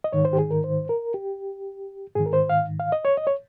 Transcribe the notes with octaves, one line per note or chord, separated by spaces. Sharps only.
D#5
G#2 D#3 C#5
C5
G4
G#4
A#4
C5
A#4
G4
G#2 D#3 G#4
A#4
C5
F5
F5
D#5
C#5
D#5
C#5